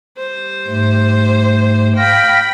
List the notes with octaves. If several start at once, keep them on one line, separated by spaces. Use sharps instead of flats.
G3 C5
G#2 A3
F5 G5 B5 F6 A#6